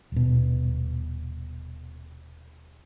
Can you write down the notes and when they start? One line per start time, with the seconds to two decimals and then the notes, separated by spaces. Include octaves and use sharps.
0.12 D#1 B2